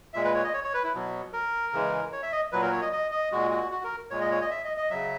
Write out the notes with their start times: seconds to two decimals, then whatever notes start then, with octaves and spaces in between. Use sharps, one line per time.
0.14 A#2 G#3 E5
0.24 B4
0.35 C#5
0.44 D#5
0.53 C#5
0.64 C#5
0.74 B4
0.84 E4
0.94 B2 F#3
1.33 A#4
1.73 C#3 E3 G#3
2.13 C#5
2.23 E5
2.32 D#5
2.52 A#2 F#3 B4
2.62 A#4
2.72 C#5
2.82 D#5
2.92 D#5
3.11 D#5
3.32 A#2 G#3 F#4
3.51 F#4
3.72 F#4
3.84 A#4
4.11 A#2 G#3 C#5
4.21 D#5
4.31 C#5
4.41 D#5
4.51 E5
4.65 D#5
4.77 D#5
4.90 C#3 F#3 E5